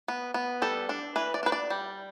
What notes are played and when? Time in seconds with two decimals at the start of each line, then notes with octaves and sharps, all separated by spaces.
0.08 B3
0.34 B3
0.62 G3 A4
0.89 D4
1.16 E3 B4
1.34 D5
1.43 D4 B4
1.52 D5
1.70 G3